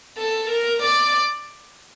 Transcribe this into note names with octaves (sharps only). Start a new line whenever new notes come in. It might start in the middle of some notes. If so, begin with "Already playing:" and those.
A4
A#4
D5